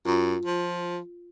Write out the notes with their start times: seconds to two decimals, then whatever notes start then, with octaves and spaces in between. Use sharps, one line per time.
0.06 F#2 F4
0.45 F3